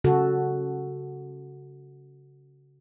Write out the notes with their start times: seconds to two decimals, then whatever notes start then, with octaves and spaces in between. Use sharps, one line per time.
0.04 C#3 F#4 A4